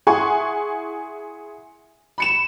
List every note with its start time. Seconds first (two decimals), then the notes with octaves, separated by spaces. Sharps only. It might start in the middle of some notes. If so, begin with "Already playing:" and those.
0.07 E4 G#4 F#5 G#5 C6 C#6
2.18 B5 C#7 E7